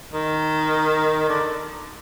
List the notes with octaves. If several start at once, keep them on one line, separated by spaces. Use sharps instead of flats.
D#3
D3